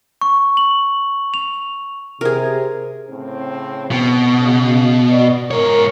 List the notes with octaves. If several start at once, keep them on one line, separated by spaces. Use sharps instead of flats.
C#6
F#7
F7
C3 G#4 A#4
A2 C#3 C4
B2
C#3
B4 D5 D#5
G#2 A#4 C#5